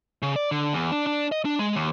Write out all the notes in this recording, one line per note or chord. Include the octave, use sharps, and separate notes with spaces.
C#3
D5
D3
E2
D4
D4
D#5
D4
G#3
D#2